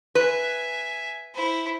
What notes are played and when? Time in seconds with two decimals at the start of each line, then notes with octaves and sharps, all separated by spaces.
0.15 B4 E5 G#5
1.34 E4 C5